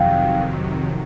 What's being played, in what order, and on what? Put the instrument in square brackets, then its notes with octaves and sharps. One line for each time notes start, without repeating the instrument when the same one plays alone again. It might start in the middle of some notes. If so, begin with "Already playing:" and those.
Already playing: [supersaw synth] F2 C3 D#3 F#3 [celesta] F5 G5